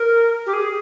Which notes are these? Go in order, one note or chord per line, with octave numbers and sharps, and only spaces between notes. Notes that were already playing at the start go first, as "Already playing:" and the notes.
Already playing: A#4
G4
G#4